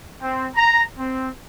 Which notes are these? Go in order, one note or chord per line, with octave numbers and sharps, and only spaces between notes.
C4
A#5
C4